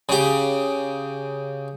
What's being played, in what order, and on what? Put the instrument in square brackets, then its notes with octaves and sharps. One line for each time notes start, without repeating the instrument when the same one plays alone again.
[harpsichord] C#3 G4